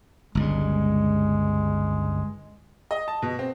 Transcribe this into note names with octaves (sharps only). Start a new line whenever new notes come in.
G1 C#2 G2 G#3
D#5
A5
B2
C4